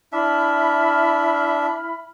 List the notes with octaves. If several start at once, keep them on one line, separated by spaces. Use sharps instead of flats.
D4 E4 E5 B5 F6